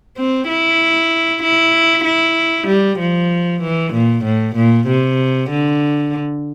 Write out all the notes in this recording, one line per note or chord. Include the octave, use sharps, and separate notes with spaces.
C4
E4
E4
E4
G3
F3
E3
A#2
A2
A#2
C3
D3